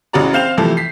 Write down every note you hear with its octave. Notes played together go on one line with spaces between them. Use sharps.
A1 C#3 E3 F#4 D5 A#5
C4 F5 G6 E7 F7
C3 E3 F3 A3
B6 C7